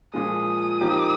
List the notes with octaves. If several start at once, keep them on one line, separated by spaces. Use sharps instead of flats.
A#2 F3 G#3 D#6
F2 D#3 A#3 D#4 G4